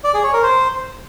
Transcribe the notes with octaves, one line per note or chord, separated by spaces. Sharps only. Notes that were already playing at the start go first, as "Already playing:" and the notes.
D5
G#4
C#5
A#4
C5